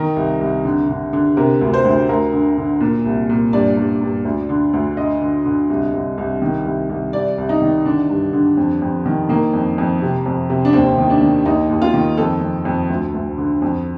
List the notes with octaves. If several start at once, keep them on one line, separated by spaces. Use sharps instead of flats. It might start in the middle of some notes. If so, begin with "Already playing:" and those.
Already playing: D#3 A#4
C2
C2
D3
D3
D3
C3 A#4
D2
C5
D2
D2 A#4
D3
D3
A#2
C2
A#2
G2 D5
G2
G2
D2
D3
D2
D3 D#5
D3
D3
C2
C2
C2
D#3
C2
C2
C2 D5
C2
D#4
D#3
D3 D4
G2
D3
F2
F2
D#3
D#3 A#3
F2
F2
C3
F2
C3
D4
D#2 C4
D#3
D4
D#3
D#2 D#4
D#2
F4
D#3
F2 A4
F2
F2
D2
D2
D3
F2